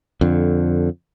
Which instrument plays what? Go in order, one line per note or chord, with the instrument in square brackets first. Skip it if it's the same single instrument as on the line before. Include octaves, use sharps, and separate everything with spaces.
[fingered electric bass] F2 D3